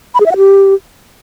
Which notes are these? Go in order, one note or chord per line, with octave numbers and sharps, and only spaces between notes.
B5
G#4
E5
F#5
G4